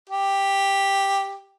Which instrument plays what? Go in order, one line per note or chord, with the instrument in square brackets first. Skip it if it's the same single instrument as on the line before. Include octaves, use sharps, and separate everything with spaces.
[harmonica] G4